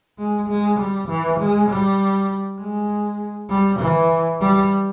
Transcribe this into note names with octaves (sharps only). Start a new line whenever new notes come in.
G#3
G#3
G3
E3
G#3
G3
G#3
G3
E3
G3